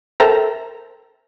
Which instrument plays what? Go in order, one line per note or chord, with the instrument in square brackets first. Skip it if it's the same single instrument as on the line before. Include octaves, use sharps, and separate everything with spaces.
[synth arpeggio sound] A4 A#4 C5 E5 G5 A#5